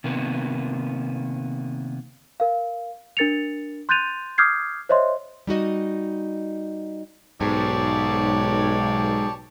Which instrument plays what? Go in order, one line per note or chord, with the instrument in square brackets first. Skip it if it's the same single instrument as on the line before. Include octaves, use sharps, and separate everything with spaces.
[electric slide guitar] C3 D#3 A#3 B3
[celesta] A#4 F5
D4 A#4 A6 C#7 F7
C6 F#6 G6 A6 D#7 F7
D6 D#6 F6 G6 G#6 C7
C5 C#5 D#5 E5 C6
[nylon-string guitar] G3 D#4 F#4 D#5
[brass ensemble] B1 [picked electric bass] G#2 [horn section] G4 C#5 D5 [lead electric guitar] G#5 A5